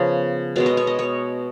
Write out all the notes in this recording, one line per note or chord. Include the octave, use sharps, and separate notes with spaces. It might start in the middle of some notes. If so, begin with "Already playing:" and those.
Already playing: C#3 F3 B3 C#5
B2 G#3 B3 C#5
D#5
C#5
D#5
C#5